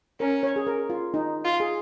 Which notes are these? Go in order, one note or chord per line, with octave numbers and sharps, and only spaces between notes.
C#4 A#4
C#5
G#4
A#4
F4
D#4
F4
G#4